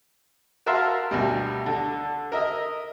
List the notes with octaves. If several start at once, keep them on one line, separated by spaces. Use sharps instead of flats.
F#4 A#4 E5 F5 A5 C6
D2 B2 G3
D3
A#4 D#5 E5